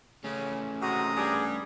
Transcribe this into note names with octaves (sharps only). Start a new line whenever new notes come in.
C#3 A3 C#4
C3 G#3 F#4 A#5 D#6
G2 G3 G#4